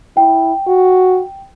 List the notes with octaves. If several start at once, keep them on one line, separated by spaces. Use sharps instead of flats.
E4 G5
F#4